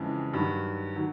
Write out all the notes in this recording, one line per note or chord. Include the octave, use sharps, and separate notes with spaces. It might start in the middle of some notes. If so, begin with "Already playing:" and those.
Already playing: F2 C#3 E3 G#3
G2 D#3 F#3
D#3 F#3